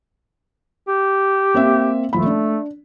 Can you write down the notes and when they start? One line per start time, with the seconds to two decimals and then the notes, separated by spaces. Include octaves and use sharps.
0.88 G4
1.54 A#3 C4 E5
2.13 D#1 F3 A3 B5
2.26 D4